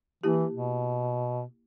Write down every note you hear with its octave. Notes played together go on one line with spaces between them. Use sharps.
E3 A#3 E4 G4
B2